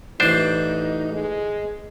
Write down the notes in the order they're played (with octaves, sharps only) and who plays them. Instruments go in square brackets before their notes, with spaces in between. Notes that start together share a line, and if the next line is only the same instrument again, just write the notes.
[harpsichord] A1 E3 [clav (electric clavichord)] D4 C5 [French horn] D#4
[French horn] G#3